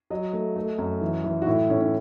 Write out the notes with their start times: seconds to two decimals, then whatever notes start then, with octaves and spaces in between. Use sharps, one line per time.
0.10 F#3 D#5
0.33 A3
0.56 A3
0.78 F#2
1.01 E3
1.24 E3
1.42 F#4
1.47 A2 E4
1.70 A2 C#4
1.81 C#4